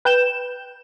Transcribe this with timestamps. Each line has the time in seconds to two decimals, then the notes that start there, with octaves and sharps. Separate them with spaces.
0.05 B4 G5 G6 E7